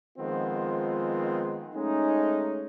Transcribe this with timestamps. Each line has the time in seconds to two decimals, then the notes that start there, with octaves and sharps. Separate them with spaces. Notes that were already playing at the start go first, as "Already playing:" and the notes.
0.18 D#3 F3 G#3 B3 C4 F4
1.74 G#3 A3 C#4 D#4